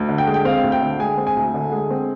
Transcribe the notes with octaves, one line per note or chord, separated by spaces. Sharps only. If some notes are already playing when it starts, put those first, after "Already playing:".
Already playing: D2
D3
G5
G#3
G5
C4 F5
D2
G5
D3
G#3 G#5
C4
G#5
D2
D3
G#3
C4